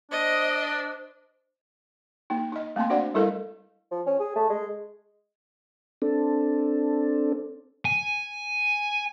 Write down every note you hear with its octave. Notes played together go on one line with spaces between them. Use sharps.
D4 C5 D#5
A#3 D#4
D#4 D#5
A3 A#3 C4 G#5 C6
D4 F#4 C5 D5 F5 F#5
G3 E4 A4 A#4 D#5 F5
F3
C#4
G#4
A3
G#3
C4 D4 A4
G#5